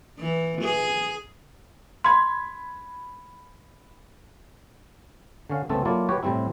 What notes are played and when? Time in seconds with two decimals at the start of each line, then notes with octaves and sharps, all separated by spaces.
0.19 E3
0.62 G#4
2.04 B5 C6 G#6
5.50 D3 C#4 F5
5.69 C2 C#3 A3 B3 C4 A4
5.85 F#3 A#3 E4 F4 A4 D5
6.09 F#4 G4 B4 C#5 G5
6.23 A2 C3 G3 C4 E4